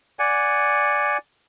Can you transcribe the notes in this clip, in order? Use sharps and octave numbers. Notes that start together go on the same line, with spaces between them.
D5 F#5 G#5